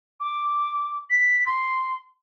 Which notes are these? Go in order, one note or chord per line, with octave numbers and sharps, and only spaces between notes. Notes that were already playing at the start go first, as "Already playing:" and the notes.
D6
B6
C6